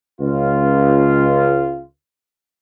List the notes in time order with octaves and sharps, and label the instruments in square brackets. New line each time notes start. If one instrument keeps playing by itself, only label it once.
[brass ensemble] C#2 F4